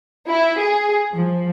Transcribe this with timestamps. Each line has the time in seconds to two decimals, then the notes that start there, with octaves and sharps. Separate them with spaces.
0.27 E4
0.60 G#4
1.12 F3